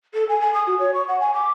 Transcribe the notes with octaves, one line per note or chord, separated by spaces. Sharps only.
A4
G#5
G#5
D#6
F#4
C#5
C#6
F#5
G#5
D6